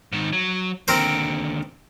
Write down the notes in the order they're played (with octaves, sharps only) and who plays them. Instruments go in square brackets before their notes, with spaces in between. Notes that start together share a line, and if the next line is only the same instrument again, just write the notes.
[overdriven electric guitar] G#2 D#3
F#3
[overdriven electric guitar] D#2 D3 [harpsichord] C4 A#4 C5